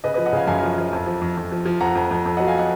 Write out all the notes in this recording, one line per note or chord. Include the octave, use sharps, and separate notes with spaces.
C#3 B4 D#5
B4 D#5
F3
D#5 F#5
C#3 F5 G#5
F#2 F5 G#5
F3
F3
F2
F3
F2
F2
F3
F3
F2 F#5 A#5
F2
F2
F2
F#3 D#5 F#5
F5 G#5
D#5 F#5